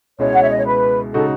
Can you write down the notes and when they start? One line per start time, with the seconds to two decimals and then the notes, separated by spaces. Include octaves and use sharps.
0.19 C#2 B2 G#3 C#4 E4 C#5
0.33 F#5
0.41 E5
0.50 D#5
0.58 C#5
0.66 B4
1.13 C#3 G#3 D#4 F#4 A4